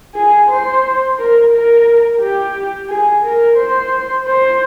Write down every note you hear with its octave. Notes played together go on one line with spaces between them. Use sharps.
G#4
C5
A#4
A#4
G4
G#4
A#4
C5
C5